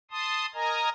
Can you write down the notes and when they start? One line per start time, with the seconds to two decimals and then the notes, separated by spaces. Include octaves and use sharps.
0.11 A5 C6 D#6
0.54 A#4 D#5 G#5 A#5